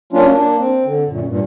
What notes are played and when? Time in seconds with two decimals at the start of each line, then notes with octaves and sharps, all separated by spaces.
0.13 F#3 A#3 C#4 D4 F4
0.30 A#3 D4
0.59 C4
0.85 D3
1.08 F#2 A#2
1.27 G2 A#2